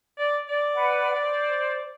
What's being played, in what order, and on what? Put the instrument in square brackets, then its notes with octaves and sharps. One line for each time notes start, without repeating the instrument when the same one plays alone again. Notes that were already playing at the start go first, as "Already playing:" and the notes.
[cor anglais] D5
D5
[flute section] B4 F#5
C5